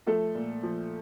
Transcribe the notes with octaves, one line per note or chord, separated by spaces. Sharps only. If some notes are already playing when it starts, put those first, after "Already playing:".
F3 A3 A4
A#2
F3